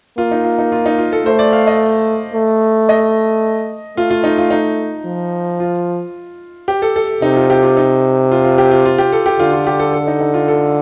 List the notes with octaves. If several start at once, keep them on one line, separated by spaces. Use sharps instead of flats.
A#3 F4
D#4
F4
D#4
F4
D#4
F4
A4
A3 C5
D5
F5
D#5
A3
D#5
A3 F4
F4
D#4
F4
D#4
F3
F4
G4
A4
A4
C3 D#4
F4
G4
F4
D#4
F4
F4
G4
F4
F4
G4
A4
G4
D3 F4
F4
G4
A4
A4
D#4
D#4
F4
A4